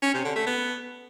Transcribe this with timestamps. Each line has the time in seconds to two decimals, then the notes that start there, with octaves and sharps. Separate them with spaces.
0.03 C#4
0.14 C3
0.25 D3
0.36 A3
0.47 B3